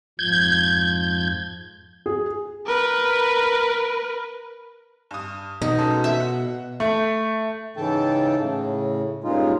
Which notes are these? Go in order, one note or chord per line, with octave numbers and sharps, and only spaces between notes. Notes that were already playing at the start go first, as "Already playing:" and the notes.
F2 G#2 F3 G6 G#6
G#4
A#4 B4
G2 D#6
B2 F#3 D#4
G#3 C#4 A4
E5
F#5
A3
G#2 C#3 E3 A4 G5 A5
A2 C#3
G2 A#2 C#3 G#3 D#4 F4